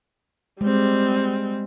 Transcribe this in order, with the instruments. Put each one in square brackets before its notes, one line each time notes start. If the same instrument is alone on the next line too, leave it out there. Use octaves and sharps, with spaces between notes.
[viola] G3 C4 [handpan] G#3